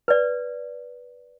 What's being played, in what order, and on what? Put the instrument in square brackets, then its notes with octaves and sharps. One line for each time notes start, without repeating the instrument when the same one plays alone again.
[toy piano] B4 D5